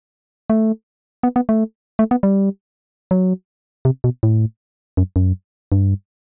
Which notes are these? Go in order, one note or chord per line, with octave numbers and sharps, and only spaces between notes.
A3
B3
B3
A3
A3
B3
G3
F#3
C3
B2
A2
F#2
F#2
G2